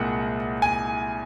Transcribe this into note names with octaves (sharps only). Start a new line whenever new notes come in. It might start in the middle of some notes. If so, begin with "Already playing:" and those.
Already playing: C2 A#2 G#3 F#5
G#5